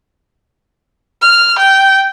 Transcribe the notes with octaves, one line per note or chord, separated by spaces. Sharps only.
F6
G5